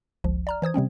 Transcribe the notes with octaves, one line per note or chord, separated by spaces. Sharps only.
G1 C#2 F3
D5 A#5 F6
E3 C5 D#6 G#6
C3 G3 C4 C#4